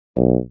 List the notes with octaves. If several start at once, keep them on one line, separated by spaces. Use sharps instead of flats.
B1